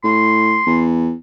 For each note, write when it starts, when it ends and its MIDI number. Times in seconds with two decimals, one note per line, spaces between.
0.04 0.60 45
0.04 0.83 84
0.66 1.13 40